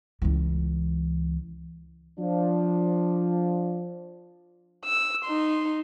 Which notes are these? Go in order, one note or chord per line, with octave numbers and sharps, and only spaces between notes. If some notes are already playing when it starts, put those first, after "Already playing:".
C#2 E3
F3 D4
E6
D#4 C6